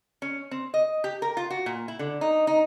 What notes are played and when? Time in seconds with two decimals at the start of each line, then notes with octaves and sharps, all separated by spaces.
0.22 C#4
0.51 C4
0.74 D#5
1.04 G4
1.22 A#4
1.37 F4
1.50 F#4
1.66 A#2
1.88 E4
1.99 D3
2.21 D#4
2.47 D#4